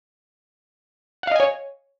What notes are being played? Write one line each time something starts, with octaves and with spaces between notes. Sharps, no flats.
C#5 D#5 F5 F#5 G#5